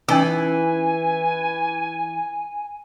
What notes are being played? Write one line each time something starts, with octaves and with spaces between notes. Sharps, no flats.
E3 C#4 D#4 G#5 E6